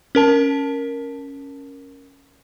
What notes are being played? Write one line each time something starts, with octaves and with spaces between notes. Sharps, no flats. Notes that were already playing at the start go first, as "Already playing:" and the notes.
C#4 A#4 A5